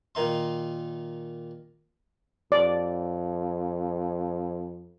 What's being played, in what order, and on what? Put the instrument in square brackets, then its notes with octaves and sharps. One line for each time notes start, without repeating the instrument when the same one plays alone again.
[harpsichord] A#2 D#3 D#4 C6
[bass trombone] F2 [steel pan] D5